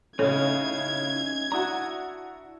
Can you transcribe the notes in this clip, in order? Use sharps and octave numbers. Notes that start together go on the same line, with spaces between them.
A2 C#3 C#4 D#4 A4 C#5 F5 G#6
D4 E4 F#4 A#5 D#6 F#6